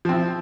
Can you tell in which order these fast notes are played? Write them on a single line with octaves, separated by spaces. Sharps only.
F3 C4 E4